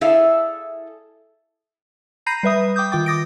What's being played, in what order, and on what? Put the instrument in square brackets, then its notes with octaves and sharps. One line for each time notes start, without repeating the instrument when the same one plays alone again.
[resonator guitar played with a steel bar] E4 G#4 A4 D5 E5 F5
[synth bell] A#5 B5 G6 A#6 C7 D#7
G3 B4 E5 D#6
G5 D6 D#6 G6
D#3 F4 G5 D6 A6
D6 D#6 A#6 D7